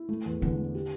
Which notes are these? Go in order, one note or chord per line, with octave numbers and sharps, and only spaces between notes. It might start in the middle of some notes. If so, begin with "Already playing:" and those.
Already playing: E4
A3
E2
E2 D3
A3
G4